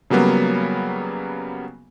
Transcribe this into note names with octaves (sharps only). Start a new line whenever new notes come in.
C#3 F#3 G3 A#3 B3